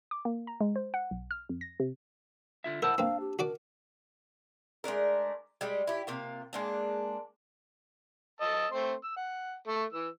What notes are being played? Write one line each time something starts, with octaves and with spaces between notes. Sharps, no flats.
D6
A#3
A#5
G#3
C5
F#5
B1
F6
F2
A#6
C3
D3 F4 E5
E4 A#4 C5 F#5 A5 E6
A#3 C4 D4 F5
G4
F#4 A#4 D5 D6
G#3 A3 D4 A#4
G3 G#3 G4
E4 G4
C3 A#3 F4
G#3 A#3 D4
D#5 A5 E6
A3 C4 C6
E6
F#5
A3 A4
E3 E6